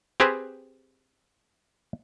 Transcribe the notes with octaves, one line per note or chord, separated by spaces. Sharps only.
C4 G4 G#4 B4 C5